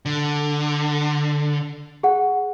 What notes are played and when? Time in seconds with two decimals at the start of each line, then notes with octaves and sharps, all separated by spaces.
0.06 D3
2.03 G#4 F#5